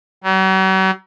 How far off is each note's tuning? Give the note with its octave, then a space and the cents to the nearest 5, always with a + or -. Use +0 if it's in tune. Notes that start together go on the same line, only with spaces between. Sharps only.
F#3 +45